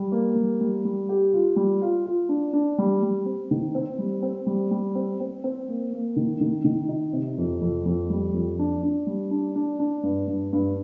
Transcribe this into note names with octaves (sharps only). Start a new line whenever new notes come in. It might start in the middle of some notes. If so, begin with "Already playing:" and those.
Already playing: G3
A#3
G3
G3
G3
G4
F4
G3
F4
F4
D4
D4
G3
G3
C4
D#3
C4
G3
C4
G3
G3
C4
C4
C4
A#3
A#3
D#3
D#3
D#3
D#4
C3
F2
F2
F2
G3
F2
D4
D4
G3
D4
D4
D4
G2
G2
G2